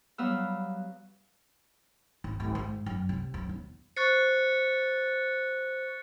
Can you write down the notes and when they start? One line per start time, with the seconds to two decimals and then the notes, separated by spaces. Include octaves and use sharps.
0.18 F#3 G3 B3 F5 E6
2.24 G#1
2.40 G#1
2.55 G#2
2.86 F#2
3.09 C3
3.34 F#2
3.49 E2
3.97 C5 C#6 F#6 A6 C#7